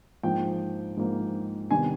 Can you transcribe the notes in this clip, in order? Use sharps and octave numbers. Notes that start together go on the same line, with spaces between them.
G#2 F3 A#3 G5
G#2 F3 A#3
C3 D#3 G3 B3 G#5